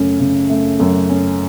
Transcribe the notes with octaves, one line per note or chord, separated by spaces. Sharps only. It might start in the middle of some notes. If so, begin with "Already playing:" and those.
Already playing: F#2 C#3 A3 C#4
C#3
A3
F#2
C#4